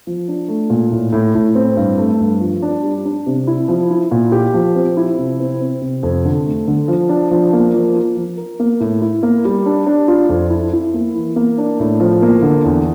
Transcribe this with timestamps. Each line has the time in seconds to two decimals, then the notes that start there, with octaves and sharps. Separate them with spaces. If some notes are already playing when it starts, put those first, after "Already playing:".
0.07 F3
0.28 D4
0.48 A3
0.70 A#2
0.92 A2
1.13 A2
1.35 A2
1.55 C4
1.77 G2
1.98 A3
2.20 G2
2.40 F3
2.62 D4
2.83 G3
3.05 D4
3.26 C3
3.47 E4
3.68 F3
3.91 E4
4.11 A#2
4.32 G4
4.54 F3
4.75 C4
4.97 E4
5.18 C3
5.40 C4
5.61 C4
5.81 C3
6.03 F2
6.25 D3
6.46 A3
6.67 D3
6.88 F3
7.09 D4
7.31 F3
7.53 A#3
7.74 F3
7.96 F4
8.17 F3
8.37 A#4
8.60 A#3
8.80 A2
9.02 E4
9.23 A#3
9.45 G3
9.66 D4
9.87 D4
10.08 F4
10.29 F2
10.50 E4
10.73 E4
10.94 A#3
11.14 E3
11.36 A#3
11.58 D4
11.79 A2
12.00 F3
12.22 A#3
12.42 D3
12.64 E2